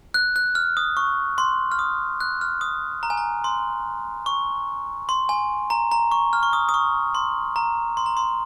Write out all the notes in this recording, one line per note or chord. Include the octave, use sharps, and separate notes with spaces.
F#6
F#6
F6
D#6
C#6
C6
F6
D#6
F#6
F6
D#6
A#5
G#5
A#5
C6
C#6
C6
G#5
A#5
A#5
C#6
F6
C#6
D#6
D#6
C#6
C6
A#5
C6
A#5
C6